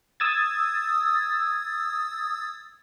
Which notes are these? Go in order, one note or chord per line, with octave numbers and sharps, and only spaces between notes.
D#6 E6 G#6 A6